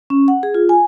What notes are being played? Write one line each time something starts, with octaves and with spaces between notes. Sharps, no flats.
C#4
F#5
G#4
F4
G#5